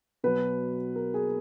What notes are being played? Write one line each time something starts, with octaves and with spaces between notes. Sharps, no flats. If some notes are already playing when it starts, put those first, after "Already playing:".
B2 F#3 B4
A#4
G#4